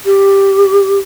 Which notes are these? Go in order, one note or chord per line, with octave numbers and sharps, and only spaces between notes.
G4